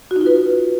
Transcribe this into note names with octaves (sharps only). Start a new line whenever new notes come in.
F#4
D#4
F4
B4